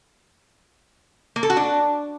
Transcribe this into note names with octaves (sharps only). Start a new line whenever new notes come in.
A#3
A4
F#4
D4